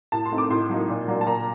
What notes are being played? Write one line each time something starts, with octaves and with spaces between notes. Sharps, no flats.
A2 A5
C6
A3 C4 D#4
D6
A2 C6
F#3 A#3 D#4
A#2
F#3 A#3 D4
A5
A#2 A#5